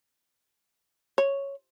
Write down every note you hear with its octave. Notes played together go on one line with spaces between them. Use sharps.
C#5